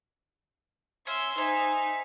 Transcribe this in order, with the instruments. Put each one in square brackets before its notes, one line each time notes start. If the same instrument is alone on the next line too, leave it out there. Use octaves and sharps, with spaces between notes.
[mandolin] C#4 [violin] E5 C6
[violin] D#4 [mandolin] C5 E5 G#5